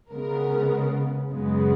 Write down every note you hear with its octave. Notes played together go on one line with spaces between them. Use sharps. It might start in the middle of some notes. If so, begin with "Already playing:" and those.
C#3 G#3 B3 A#4
F#2 C#3 G#3 B3